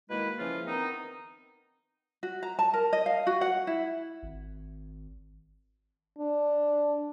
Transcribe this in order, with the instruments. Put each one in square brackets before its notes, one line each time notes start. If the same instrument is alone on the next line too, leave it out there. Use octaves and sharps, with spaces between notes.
[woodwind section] B2 D#3 G#3 A#3 E4 B4
C#3 E3 F3 A#3 C#4 F4
D#3 B3 C4 D#4
[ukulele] F#4
A#5
A5
A#4
D#5
F5
F#4
F#5
E4
[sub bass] G#1
[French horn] D4